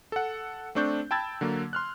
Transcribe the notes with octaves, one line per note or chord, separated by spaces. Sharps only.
A4 F#5
A3 C4 D4 C#6 G6
G5 A5 B5 E6 G#6 A6
D3 F#3 A#3
C6 F6 F#6